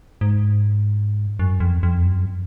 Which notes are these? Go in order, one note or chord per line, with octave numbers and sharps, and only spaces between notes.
G#2
F#2
F2
F2
F#2